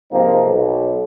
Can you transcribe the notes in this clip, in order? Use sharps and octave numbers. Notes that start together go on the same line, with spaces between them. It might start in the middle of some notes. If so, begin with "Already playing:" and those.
G#2 C3 F3 A#3 C4 D#4
B1